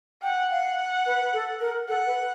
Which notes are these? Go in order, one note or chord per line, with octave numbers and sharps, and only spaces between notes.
F#5 G5
F5
B4
A4
A#4
A4 F#5
B4